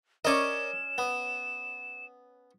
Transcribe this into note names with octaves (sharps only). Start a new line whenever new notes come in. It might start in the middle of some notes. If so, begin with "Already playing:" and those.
C#4 A#4 D5 D#5 D6 E7
B3